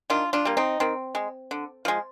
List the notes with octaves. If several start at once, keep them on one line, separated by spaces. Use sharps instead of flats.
D#3 D4 F4
D4 F4
G3 A#3
C4 D#4
D#3 C4
G#3
D3
F3 G#3